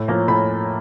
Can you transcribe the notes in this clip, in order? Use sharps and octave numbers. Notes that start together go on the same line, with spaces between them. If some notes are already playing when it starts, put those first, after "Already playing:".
Already playing: A2
F3 A#3 C#4 A#5
A2 B5